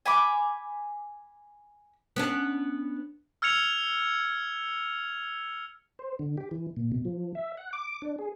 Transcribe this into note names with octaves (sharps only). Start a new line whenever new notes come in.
G#5 B5 D6
B3 C#4 D4
E6 F6 G#6 C#7 F7
C5
D3
G4
E3
A#2
B2
F3
E5
F#5
D6
D4
G#4